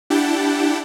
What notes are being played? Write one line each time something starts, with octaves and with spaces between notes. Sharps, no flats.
D4 E4 G4 F#5 G5 A5